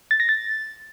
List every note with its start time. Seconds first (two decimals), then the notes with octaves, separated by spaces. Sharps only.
0.11 A6
0.20 A#6
0.29 A6